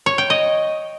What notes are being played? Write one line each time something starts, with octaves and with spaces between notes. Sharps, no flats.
C#5
G5
D#5